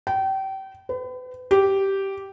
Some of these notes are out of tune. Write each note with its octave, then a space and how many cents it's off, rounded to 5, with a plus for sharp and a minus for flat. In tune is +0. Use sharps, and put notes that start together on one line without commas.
G5 -30
B4 +35
G4 -10